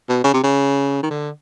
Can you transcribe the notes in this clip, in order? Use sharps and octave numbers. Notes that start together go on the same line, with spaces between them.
B2
C#3
C3
C#3
D#3
D3